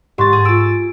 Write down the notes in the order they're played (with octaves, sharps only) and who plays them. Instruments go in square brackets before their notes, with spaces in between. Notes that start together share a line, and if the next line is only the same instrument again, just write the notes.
[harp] G#2 A6 [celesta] G4 C6 C#6
[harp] G#4
[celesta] F4 D7 [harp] E6 A6